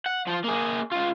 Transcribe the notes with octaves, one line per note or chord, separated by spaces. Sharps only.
F#5
F3 F4
A#3 G#4
C#2 F4